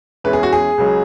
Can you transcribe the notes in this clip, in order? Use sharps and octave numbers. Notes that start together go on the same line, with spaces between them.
E2 E3 G#3 C#4 B4
G#4
F#4
G#4
C#2 C#3 F#3